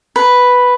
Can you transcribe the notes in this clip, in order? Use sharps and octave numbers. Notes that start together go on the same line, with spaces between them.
B4